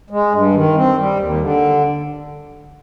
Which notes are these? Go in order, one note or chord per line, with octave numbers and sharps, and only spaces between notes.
G#3
G2
D#3
C4
G3
D#2
D3